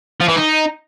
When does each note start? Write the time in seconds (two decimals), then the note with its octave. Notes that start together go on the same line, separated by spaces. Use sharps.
0.20 F3
0.28 E3
0.36 D#4